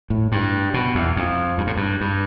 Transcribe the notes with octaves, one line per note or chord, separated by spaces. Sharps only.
A2
G2
B2
E2
F2
G2
A2
G2
G2